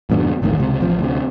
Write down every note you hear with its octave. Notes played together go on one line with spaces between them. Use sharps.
F2 G#2 B2 D3
A#1 E2 A2 D#3
C#2 C3
A1 F3
D2 C3